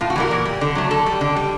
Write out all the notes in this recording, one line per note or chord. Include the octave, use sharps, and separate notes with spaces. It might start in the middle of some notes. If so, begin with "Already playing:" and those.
A2 F4
F#4
E3 G3 A#4
A#2
G3
D3
F#3 A3
D3 A4
G3
D3
G3